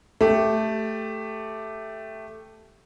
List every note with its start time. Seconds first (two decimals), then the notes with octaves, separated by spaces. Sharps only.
0.21 A3 G4